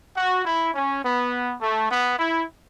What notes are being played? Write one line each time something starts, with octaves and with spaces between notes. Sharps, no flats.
F#4
E4
C#4
B3
A3
B3
E4